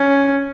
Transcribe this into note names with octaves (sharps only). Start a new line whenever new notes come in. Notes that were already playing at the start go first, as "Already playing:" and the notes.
Already playing: C#4